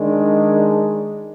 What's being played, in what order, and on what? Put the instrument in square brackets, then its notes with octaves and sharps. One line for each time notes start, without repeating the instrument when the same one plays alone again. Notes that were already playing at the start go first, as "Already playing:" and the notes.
Already playing: [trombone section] D#3 G#3 D4